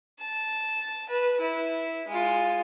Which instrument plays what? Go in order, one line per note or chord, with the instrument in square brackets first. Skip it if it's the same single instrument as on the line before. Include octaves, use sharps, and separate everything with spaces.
[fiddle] A5
B4
E4
G#3 F4